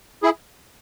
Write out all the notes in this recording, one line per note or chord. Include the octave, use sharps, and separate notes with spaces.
E4 G#4